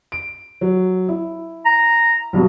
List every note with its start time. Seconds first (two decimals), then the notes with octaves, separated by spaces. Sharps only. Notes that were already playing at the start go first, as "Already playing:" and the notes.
0.12 D7
0.61 F#3
1.09 E4
1.65 A#5
2.33 B1 G2 B2